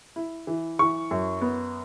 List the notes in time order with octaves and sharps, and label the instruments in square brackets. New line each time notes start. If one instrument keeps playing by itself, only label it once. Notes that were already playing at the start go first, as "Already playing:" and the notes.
[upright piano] E4
E3
E3 C#6
F#2
B3